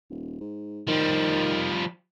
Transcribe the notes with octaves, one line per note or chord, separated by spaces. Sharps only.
D#1
G#2
D#3 F3 G3